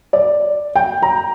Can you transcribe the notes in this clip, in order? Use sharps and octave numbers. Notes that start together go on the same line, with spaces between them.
D5
G5
A#5